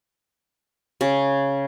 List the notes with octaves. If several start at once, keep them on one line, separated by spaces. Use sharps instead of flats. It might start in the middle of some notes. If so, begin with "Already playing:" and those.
C#3